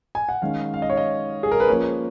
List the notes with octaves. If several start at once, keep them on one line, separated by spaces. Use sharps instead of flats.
G#5
F#5
D#3 G#3 C#4 F5
F5
D#5
C#5
D#5
G#4
A#4
B4
F3 A#3 C#4 C#5